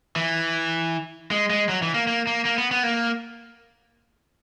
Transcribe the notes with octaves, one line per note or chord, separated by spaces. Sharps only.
E3
G#3
G#3
F#3
E3
A#3
A#3
A#3
A#3
B3
B3
A#3